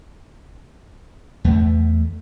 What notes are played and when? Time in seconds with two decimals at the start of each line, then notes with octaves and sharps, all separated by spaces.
1.44 E2 A3